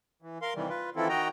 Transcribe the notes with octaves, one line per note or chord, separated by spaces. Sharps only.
E3
A#4 F5 C6
C3 D#3 E3 G3
F4 B4
D#3 E3 C4 E4 F4 A4
D#3 F#4 D#5 G5 A#5